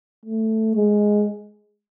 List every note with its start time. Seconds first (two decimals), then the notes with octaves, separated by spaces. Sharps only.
0.25 A3
0.76 G#3